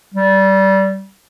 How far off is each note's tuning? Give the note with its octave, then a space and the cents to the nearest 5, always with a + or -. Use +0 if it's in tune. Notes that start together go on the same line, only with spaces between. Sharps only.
G3 -20